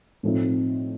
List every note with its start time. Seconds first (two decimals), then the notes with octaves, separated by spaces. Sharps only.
0.23 A2 F3 A3 C4 D#4